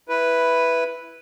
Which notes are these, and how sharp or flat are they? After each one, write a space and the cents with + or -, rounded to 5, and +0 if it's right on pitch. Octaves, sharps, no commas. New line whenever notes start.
E4 +0 B4 +0